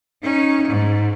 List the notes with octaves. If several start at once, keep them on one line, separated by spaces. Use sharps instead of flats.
C#4 D#4
G#2